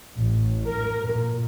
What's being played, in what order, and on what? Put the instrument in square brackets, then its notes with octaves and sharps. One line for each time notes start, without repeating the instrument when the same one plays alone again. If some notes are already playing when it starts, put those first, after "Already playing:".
[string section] A1
A#4
A#2